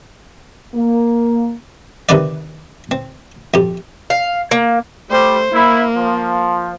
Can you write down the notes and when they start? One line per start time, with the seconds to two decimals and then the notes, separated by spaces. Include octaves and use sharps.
0.75 A#3
2.09 C3 D#3 C4 B4 D5
2.91 C4
3.54 F2 G4
4.10 F5
4.51 A#3
5.10 G3 A3 C5
5.52 A#3 E4
5.95 F3